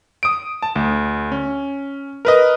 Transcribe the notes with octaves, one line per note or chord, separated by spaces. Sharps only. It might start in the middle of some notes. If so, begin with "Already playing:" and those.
D#6 D7
A5
D2
C#4
A#4 B4 D#5